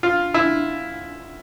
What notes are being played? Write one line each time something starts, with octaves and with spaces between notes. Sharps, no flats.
F4
E4